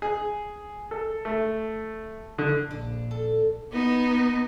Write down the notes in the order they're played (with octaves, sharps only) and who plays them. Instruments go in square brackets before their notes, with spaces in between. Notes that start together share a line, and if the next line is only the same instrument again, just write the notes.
[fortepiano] G#4
A4
A3
D3
[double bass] A#1 [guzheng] D4
[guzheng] A4
[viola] B3 D#4